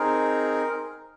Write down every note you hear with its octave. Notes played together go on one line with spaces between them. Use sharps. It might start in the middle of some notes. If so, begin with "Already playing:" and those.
Already playing: C4 D#4 G#4 A#4